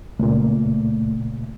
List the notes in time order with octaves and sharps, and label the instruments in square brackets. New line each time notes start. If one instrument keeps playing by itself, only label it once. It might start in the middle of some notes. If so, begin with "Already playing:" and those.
[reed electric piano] C#2 A#2 [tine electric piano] A3